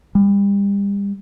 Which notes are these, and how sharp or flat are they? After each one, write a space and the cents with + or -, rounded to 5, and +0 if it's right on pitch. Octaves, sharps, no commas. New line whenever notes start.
G3 +35